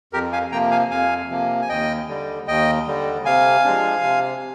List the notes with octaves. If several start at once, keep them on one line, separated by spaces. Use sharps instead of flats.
F2 G4 A#4
F5 G#5
C3 F3 A#3 G5 A#5
F5 G#5
F2 F5 G#5
C3 F3 A#3
G#5
D#2 D#5 G5
D3 G3
D#2 D#5 G5
D3 G3
C3 F5 G#5
F3 G#3 D4
C3